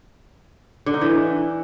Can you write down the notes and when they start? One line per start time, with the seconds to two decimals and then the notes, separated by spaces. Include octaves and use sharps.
0.86 D3
0.94 D#4
1.01 E3